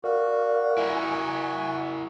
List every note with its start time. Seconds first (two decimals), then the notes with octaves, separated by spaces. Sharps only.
0.04 F#4 A#4 D5 F5
0.77 E4 A#4 G#5